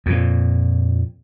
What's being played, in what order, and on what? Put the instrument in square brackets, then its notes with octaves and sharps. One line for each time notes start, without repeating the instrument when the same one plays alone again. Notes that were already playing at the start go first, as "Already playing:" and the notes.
[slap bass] F2 A#2